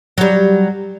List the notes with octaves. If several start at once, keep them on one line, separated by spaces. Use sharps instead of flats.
F#3 G3